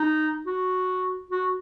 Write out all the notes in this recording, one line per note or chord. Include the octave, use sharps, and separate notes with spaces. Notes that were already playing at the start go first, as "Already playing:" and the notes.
Already playing: D#4
F#4
F#4